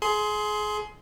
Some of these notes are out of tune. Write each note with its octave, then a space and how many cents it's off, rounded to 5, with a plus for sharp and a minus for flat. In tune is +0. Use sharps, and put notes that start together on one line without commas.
G#4 +25 C6 +0